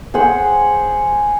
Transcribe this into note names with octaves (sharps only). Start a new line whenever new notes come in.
G#4 C5 F#5 E6